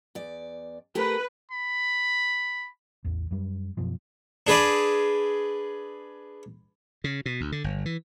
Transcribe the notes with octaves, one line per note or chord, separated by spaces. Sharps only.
E2 D5
A3 G4 A#4 B4
B5
A1 E2
F#2 G3
F#2 B2 F3
D4 G#4 B4 D5
C#3
B2
D2
D3
G1
E3